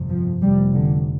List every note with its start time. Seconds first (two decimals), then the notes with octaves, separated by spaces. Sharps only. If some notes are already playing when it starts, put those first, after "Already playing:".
Already playing: G1 F2 C3
0.09 F3
0.41 F1 F2 C3 G3
0.74 D3